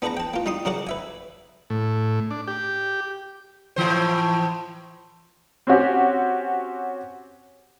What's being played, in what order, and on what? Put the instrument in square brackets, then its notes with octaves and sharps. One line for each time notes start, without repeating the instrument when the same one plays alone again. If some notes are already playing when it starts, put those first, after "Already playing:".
[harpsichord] B3 D4 G#4 B4 F#5 A#5
G5 A5
A#3 F4
G3 D#4 C6 D#6
C#3 F#3 A#4 D5 F#5
B4 E5 G#5
[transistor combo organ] A2
D4
G4
[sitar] A2 E3 C5
[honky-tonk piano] C4 C#4 F#4 G4